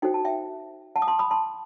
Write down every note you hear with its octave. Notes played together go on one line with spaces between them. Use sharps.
D#4 F#4 A4 C5 G5
A5
E5 G5
F#5 A5
D#6
A5 C6
B5 D#6
A5 C6